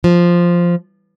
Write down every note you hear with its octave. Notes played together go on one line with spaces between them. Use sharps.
F3